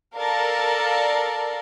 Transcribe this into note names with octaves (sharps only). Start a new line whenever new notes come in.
A4 A#4 D5 F5 A5